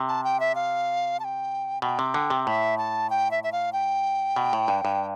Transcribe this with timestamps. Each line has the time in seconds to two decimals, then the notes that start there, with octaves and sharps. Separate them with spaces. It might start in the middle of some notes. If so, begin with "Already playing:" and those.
Already playing: C3
0.08 A5
0.24 G5
0.40 E5
0.55 F5
1.20 A5
1.24 G5
1.82 B2 G5
1.99 C3
2.14 D3
2.30 C3
2.46 A2 E5
2.78 A5
3.10 G5
3.31 E5
3.44 E5
3.52 F5
3.73 G5
4.36 B2
4.53 A2
4.68 G2
4.85 G2